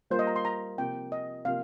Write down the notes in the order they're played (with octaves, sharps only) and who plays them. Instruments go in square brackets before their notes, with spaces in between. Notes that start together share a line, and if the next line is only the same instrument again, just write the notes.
[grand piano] G3 A#3 F4 A#4 [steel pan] C5
[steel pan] D#5
A#5
C6
A#5
[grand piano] C3 F3 A#3 G4 A#4 [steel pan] G5
[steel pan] D#5
[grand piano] C3 F3 A#3 G4 A#4 [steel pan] F5